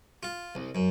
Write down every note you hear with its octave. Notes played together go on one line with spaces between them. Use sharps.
F4
C2
F#2